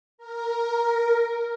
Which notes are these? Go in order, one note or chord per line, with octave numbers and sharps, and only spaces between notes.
A#4